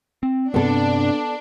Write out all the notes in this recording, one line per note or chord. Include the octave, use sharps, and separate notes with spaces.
C4
G2 C3 B3 C4 D4 A4